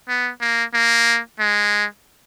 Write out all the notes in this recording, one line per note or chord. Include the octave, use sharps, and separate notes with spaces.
B3
A#3
A#3
G#3